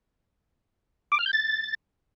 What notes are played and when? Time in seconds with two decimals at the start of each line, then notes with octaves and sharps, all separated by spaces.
1.12 D6
1.19 F6
1.26 G6
1.33 A6